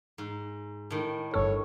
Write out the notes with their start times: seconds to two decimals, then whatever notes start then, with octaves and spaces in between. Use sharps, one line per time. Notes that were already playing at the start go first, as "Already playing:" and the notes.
0.18 G#2
0.90 A2 D#3
1.34 G1 G2 A4 C#5